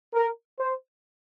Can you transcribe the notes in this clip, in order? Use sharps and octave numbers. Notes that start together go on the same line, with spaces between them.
A#4
C5